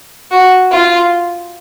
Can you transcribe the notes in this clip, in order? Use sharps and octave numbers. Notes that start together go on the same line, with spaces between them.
F#4
F4